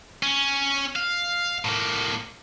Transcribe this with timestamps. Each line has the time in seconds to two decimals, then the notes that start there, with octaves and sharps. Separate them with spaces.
0.23 C#4
0.96 F5
1.65 A2 A#3